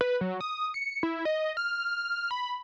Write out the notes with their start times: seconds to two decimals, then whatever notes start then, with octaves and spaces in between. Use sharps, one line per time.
0.01 B4
0.21 F#3
0.41 D#6
0.74 C#7
1.03 E4
1.25 D#5
1.57 F6
2.31 B5